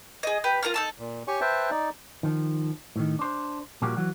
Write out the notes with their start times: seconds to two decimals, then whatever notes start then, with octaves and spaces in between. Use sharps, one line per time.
0.23 G#4 D#5
0.44 G4 B4 G6
0.63 F4 A#4 A#5 F6
0.74 D#4 A4 A5
0.99 A#2
1.28 G4 C#5 G#5 C#6
1.41 B4 C5 E5 G5 A5
1.71 D#4 D5
2.23 D#3 F3
2.96 A2 D#3
3.19 D4 C5
3.82 A#2 F3 G3 A#3 F#4 G4
3.97 E3 F#3 F#5